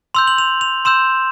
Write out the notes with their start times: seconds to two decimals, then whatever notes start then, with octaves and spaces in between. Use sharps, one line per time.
0.14 C6 E6 G6 F7
0.27 F#7
0.38 F7
0.61 F7
0.85 C6 E6 G6 E7